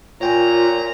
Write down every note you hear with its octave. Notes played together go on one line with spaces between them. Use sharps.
A#2 F4 C#5 G5 G#5 A#5